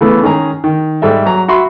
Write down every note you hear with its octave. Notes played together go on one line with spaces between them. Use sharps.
C#3 E3 A3 B3
D#3 G#3 C#4 G#4 A#5
D#3
G#2 G3 A4 E5
F#3 A#5
F#4 E5 B5 C6